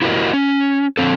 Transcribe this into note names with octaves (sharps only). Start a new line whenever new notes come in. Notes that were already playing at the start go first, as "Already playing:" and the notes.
E4 F#4 G4 A4 A#4 D#5
C#4
D3 F3 C4 A4